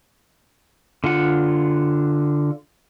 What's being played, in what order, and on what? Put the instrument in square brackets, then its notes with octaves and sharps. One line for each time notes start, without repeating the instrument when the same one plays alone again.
[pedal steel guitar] D3 F4 F#5